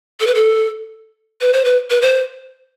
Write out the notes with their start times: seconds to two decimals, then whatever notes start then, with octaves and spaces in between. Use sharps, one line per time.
0.20 A4
0.27 B4
0.35 A4
1.41 B4
1.53 C5
1.65 B4
1.90 B4
2.02 C5